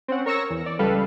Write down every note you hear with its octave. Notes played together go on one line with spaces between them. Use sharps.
C4 C#4 F#5
A#4 C#5 C#6 E6 A#6
E2
D5
C#2 G3 A4 B4 F5